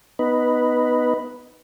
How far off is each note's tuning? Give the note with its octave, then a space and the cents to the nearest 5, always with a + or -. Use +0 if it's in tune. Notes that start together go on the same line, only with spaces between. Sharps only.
B3 +0 D#4 +0 B4 +0